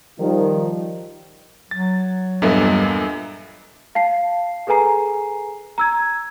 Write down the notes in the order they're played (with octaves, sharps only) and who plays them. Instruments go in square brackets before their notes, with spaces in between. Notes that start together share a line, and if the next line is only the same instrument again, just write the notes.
[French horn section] D#3 F3 G3
[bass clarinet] F#3 [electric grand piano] A6
[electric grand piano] E2 A#2 B3 [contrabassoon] G2 [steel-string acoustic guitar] A4 D#5 E5
[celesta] F5 A5 C7
G#4 A4 B4 G#5 A#5 C7
A#5 E6 G#6